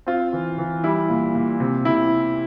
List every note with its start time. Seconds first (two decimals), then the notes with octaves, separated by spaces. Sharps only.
0.07 C4 F4
0.33 E3
0.58 E3
0.84 G3 E4
1.09 A#2
1.35 A#2
1.60 C3
1.85 C3 E4